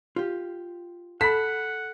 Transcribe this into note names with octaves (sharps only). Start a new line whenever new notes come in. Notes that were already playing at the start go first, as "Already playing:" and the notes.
F4 G4
A4 F#5 A5 B5 B6